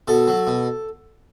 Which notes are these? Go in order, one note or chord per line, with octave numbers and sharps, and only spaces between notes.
B2 A4
F#3
B2